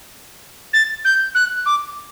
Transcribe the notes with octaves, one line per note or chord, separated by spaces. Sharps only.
A6
G6
F#6
D6